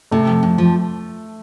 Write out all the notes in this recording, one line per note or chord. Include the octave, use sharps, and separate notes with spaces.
C3 A3
F2
F2
F3